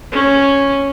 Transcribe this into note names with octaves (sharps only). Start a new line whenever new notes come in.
C#4